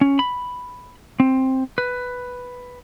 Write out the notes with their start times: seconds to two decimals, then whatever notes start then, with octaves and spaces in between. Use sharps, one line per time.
0.01 C#4
0.19 B5
1.20 C4
1.78 B4